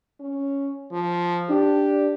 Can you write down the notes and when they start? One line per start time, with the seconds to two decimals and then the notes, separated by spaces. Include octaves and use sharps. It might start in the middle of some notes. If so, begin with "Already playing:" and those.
0.20 C#4
0.92 F3
1.49 D4 G4